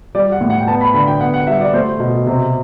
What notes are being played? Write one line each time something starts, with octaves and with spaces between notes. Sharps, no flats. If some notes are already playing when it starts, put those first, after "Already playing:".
G3 D5
F#5
A2
F#5
G5
B3 A5
B5
D3 B5
G5
B3 F#5
F#5
G3 E5
D5
A3 C5
B2
C3